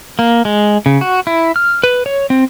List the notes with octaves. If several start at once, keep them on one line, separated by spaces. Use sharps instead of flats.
A#3
G#3
C#3
F#4
E4
F6
B4
C#5
C4